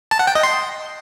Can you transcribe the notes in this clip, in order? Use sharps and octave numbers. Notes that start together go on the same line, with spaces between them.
A5
F#5
G5
D#5
C6